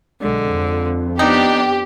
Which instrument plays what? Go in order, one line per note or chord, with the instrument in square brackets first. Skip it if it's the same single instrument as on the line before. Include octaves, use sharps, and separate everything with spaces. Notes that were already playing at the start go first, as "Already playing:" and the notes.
[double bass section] B1 G#3 [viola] D3
[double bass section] F2
[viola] B3 D4 [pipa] D#4 [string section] G4